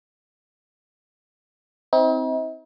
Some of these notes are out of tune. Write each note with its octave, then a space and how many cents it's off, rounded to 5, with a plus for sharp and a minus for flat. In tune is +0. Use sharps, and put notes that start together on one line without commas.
C4 +0 D#4 +45